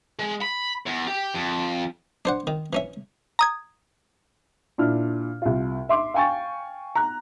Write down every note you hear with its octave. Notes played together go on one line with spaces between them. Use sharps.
G#3
B5
E2
G4
F2
D4 C5 F#5
D#3
E3 C#4 E5
A#5 D#6 G#6
A#2 D4 E4 F6
C2 F4
E5 C6 D6
F5 G5 G#5 C#6 A6
A#5 F#6